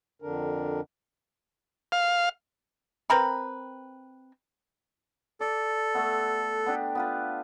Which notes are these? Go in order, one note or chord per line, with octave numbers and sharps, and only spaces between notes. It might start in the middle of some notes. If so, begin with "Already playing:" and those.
F2 D3 D4 A#4
F5
C4 A#4 B4
A4 D5
A3 B3
B3 D4 G4
B3 F4 B4